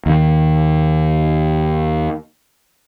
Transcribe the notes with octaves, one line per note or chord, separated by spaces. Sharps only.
D#2 D#3